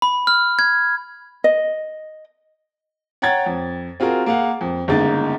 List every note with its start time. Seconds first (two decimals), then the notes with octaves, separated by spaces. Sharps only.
0.02 B5
0.27 F6
0.59 G#6
1.44 D#5
3.22 C#5 F#5 G5 A#5 G#6 A6
3.46 F2
4.00 C4 F4 F#4 G#4 A#4
4.26 A#3 G#4 F5 F#5
4.61 F2
4.88 G1 C#3 G#3 A#3 D#4 A6